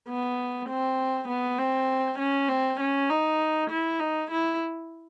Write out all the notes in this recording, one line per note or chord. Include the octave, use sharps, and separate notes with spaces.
B3
C4
B3
C4
C#4
C4
C#4
D#4
E4
D#4
E4